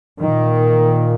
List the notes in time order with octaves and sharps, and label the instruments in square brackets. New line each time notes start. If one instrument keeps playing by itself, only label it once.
[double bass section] A#2 D#3